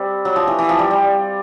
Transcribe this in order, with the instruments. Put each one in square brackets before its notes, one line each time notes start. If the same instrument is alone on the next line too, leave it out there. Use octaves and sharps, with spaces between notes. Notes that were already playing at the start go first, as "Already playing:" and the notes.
Already playing: [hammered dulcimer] G3 C4
F#3
F3
E3
E3
F3
G3
G3